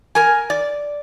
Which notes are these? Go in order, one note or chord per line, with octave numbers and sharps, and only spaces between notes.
A#4 G#5
D5